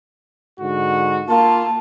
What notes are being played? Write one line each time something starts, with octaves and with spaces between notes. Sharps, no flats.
G#2 D3 F#4
A#3 F4 A5